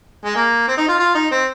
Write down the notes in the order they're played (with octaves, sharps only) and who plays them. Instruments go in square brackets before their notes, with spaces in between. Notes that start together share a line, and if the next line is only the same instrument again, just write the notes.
[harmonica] G#3
A#3
C4
D#4
F4
F4
D#4
C4